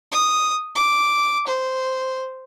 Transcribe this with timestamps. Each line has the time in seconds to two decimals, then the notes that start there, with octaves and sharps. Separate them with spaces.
0.12 D#6
0.75 D6
1.47 C5